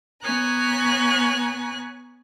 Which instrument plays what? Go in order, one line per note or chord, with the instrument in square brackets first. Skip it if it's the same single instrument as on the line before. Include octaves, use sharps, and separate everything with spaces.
[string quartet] B3 C#5 G#5 A#5 F#6